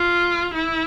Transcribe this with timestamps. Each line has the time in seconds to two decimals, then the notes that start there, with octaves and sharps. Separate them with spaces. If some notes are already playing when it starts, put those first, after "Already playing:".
Already playing: F4
0.54 E4